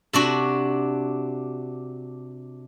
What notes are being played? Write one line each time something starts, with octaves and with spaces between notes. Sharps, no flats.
C3 D4 F#4